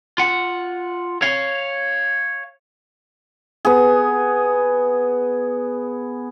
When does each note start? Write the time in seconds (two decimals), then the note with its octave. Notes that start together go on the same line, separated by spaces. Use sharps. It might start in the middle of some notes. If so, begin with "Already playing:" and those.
0.18 F4 F#5
1.22 C#5 F5
3.65 B3 G#4